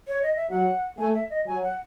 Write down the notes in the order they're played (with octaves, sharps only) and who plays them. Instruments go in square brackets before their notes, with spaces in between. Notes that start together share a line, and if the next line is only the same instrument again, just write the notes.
[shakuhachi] C#5
D#5
E5
[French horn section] F#3 [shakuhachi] F#5
[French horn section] A3 [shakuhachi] G#5
[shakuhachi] E5
D#5
[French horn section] F#3 [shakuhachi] G#5
[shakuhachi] F#5